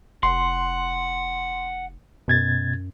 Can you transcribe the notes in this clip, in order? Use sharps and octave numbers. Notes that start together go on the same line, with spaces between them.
F1 F#5 C6
F#2 B2 G#6 A6